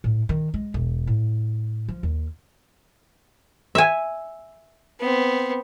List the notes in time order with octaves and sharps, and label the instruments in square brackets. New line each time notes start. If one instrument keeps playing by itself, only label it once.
[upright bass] A2
D#3
G#3
E1
A2
F3
D#2
[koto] E5 G#5
[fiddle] B3 C4